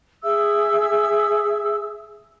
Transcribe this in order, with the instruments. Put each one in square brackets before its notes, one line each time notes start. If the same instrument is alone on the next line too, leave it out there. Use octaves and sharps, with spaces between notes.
[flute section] G#4 E5 E6